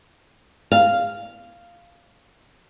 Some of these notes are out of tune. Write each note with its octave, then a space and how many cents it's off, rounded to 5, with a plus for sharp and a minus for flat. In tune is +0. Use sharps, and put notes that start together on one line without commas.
F5 -5